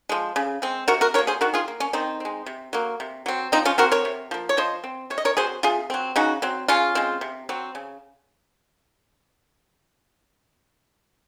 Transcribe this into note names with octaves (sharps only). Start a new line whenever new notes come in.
F3 G#3
C#3
G#3 C4
C3 F#4 A#4
F#4 A#4
F#3 A#3 A#4 C#5
G#4 C5
D#3 F#4 A#4
F4 G#4
A#3
C#4
D#3 C4 D#4
G#3 C4
C3
F#3 A#3
C3
F#3 C4
F3 C4 D#4
C#4 F4
C4 F#4 A#4
A#4 C#5
C3
F3 A#3
C#5
F3 C5 D#5
C4
C3 C#5
D#5
A#4 C#5
F#3 C4 G#4 C5
C3 F4 G#4
F#3 C4
C#3 D#4 F#4
F#3 C4
C#3 C#4 F4
G#3 C4
C3
F#3 C4
C#3